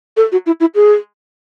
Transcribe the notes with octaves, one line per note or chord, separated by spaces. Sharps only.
A4
F#4
E4
E4
G#4